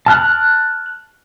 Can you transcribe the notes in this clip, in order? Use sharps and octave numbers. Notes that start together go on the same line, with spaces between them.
A5 F6 F#6